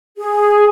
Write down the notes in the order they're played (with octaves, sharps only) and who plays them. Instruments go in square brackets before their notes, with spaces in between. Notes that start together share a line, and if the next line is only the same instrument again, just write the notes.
[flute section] G#4